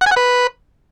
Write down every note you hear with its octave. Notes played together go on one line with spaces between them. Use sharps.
F#5
G#5
F#5
B4